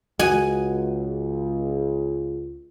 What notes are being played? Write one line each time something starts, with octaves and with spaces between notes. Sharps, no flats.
C#2 F#4 D#5 G#5